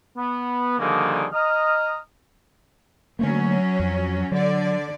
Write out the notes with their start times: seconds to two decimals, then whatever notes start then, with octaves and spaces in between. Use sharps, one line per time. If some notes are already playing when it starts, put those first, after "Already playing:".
0.17 B3
0.79 D3 D#3 F3 G3 A#3 G#4
1.33 D#5 A#5 D#6 F6
3.19 D3 F#3 A3 A#3 C#4
3.80 F2
4.32 D3 F#3 D5